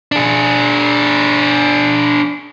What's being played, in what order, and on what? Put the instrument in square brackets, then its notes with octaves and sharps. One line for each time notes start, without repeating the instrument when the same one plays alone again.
[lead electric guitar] D4 G#4